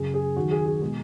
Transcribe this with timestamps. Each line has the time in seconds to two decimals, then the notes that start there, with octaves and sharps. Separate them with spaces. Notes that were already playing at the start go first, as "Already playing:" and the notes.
Already playing: F#1 F#2 C#3 G#4
0.14 G#4
0.36 D#2 D#3 F#3 F#4
0.51 G#4
0.66 G#4
0.81 B2 G#3 G#4